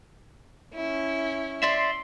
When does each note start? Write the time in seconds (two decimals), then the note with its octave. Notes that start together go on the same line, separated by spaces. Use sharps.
0.74 C#4 E4
1.63 D5 E5 C6